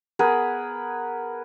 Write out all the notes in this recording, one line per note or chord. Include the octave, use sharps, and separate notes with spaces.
B3 G#4 A#4 B4